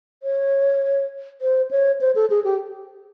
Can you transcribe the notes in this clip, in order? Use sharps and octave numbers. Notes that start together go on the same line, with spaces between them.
C#5
C5
C#5
C5
A4
G#4
G4